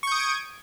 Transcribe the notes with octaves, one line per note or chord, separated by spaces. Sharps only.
C#6 D#6 G6 G#6 D7